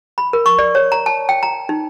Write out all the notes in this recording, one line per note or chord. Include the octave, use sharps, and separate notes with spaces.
B5
A#4
C#6
D5
C#5
A#5
A5
G5
A#5
D#4